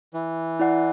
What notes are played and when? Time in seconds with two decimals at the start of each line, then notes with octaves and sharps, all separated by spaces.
0.14 E3
0.60 E4 D5 F#5